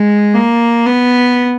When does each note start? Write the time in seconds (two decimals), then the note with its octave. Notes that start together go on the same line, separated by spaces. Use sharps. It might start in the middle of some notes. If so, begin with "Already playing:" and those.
Already playing: G#3
0.34 A#3
0.86 B3